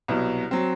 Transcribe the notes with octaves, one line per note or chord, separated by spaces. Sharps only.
C2 B2 F#3
F#3 C4